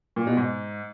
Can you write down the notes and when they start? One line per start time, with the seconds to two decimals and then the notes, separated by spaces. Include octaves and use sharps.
0.16 A#2
0.27 B2
0.37 G#2